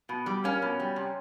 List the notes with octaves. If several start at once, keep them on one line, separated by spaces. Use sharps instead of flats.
B2
G3
A#3 C#4
B2
G3
C3